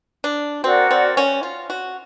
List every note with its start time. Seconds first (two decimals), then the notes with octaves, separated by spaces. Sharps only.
0.24 D4
0.63 C4 F#4 A#4 D5 F#5
0.91 C4
1.17 C#4
1.43 F4
1.70 F#4